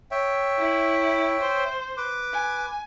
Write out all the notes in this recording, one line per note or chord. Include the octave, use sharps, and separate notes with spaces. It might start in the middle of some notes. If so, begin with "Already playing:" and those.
C#5 E5 G5
E4
C5
B4 D6
G#5